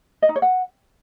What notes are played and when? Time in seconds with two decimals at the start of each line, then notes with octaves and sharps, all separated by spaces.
0.22 D#5
0.29 D#4
0.36 C#5
0.42 F#5